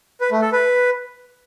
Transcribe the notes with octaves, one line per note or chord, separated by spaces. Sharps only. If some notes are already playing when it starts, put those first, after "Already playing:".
B4
A3
A4
B4